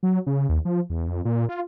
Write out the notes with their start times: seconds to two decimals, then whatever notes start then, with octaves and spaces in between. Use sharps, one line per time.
0.03 F#3
0.26 C#3
0.49 D#2
0.65 F3
0.90 E2
1.08 F2
1.25 A#2
1.49 F4